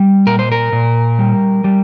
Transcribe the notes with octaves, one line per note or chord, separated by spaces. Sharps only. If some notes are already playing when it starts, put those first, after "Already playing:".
Already playing: G3
A#2 A#4
C5
A#4
A#2
G3
G3